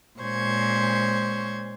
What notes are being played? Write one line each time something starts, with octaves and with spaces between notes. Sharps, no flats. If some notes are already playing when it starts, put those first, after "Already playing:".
A#2 G#3 C#4 C5 C#6 G#6